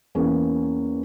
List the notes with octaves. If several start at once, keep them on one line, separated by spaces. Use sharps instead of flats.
E2 A#3 C#4